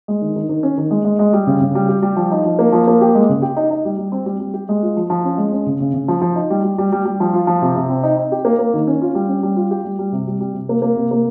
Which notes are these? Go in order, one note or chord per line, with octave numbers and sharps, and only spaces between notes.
G#3
D#3
D#3
D#3
C#4
D#3
G#3
G#3
G#3
G3
C#3
C#3
G3
G4
G3
F3
D#4
F3
A#3
F3
A#3
G4
G#3
C#3
G4
D#4
D#4
G3
G3
C4
G3
G3
G4
G#3
F4
F3
F3
C#4
G#3
C#4
C#3
C#3
C#3
F3
F3
D#4
G3
G3
G3
G3
G3
F3
F4
F3
C3
C3
C4
D#4
D#4
G4
A#3
A#3
D#3
C#4
F4
G3
C#4
G3
F4
G4
G3
G3
C3
G3
G3
C3
A#3
A#3
C3
A#3